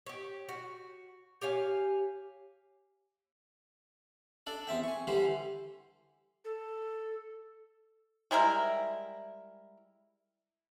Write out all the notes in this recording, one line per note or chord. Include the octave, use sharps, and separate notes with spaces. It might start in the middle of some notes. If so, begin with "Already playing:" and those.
G4 C#5
F#4
G4 C#5 F5 G#5
D4 A4 D5
E2 C4 E5 G5
G#5 C#6
D3 E3 G3 G4 C5
A4
G3 G#3 E4 A#4